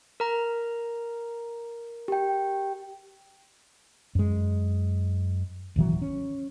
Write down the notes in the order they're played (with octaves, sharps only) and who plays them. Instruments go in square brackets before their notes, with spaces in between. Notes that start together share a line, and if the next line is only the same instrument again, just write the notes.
[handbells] A#4 A#5
[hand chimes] G4 G5
[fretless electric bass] F#2 G#3
D#1 G#1 E3 F#3
C#4